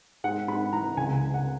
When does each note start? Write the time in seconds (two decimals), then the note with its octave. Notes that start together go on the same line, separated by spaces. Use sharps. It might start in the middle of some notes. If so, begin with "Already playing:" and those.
0.24 G#2 F#5
0.48 G#2 B5
0.73 E3 A#5
0.97 C#2 G#5
1.22 C#2
1.34 F#5